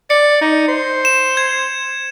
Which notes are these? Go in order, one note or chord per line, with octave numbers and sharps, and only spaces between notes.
D5 C#7
D#4
C5
E7
G#6